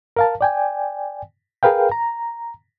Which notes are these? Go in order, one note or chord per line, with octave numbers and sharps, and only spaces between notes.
A#4 F5 A5
D5 G5 G#5
G#4 A#4 B4 F5 G5
A#5